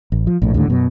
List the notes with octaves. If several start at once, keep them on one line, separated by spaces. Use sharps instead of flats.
A1
F3
A#1 A2
D#2 A2 D3
F#2 B2 F#3